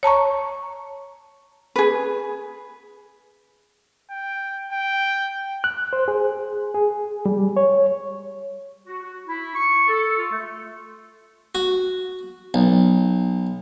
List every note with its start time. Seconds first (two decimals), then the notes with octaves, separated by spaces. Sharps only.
0.03 C#5 A5 A#5 C#6
1.76 G#4 B4
4.11 G5
4.72 G5
5.64 F#6
5.93 C5
6.08 G#4
6.75 G#4
7.26 G3
7.57 C#5
8.86 F#4
9.02 F#4
9.26 E4
9.55 C#6
9.88 A4
10.17 F4
10.31 A3
11.55 F#4
12.54 B1